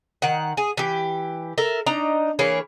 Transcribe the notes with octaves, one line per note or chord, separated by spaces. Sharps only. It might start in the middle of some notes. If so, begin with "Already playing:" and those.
D#3 F#5
G#4
E3 G4
A4 A#4 E5
D4 D#4 A#5
E3 A#3 G#4 C#5